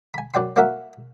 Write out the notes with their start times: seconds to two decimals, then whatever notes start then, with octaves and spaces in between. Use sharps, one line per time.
0.14 G#5 B5
0.34 F#2 F#3 D5 G5 C6
0.56 A#3 C#4 F#4 A#4 E5 F#5